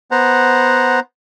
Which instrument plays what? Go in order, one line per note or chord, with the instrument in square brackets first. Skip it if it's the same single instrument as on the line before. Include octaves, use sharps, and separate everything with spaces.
[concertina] B3 C5 F#5 A#5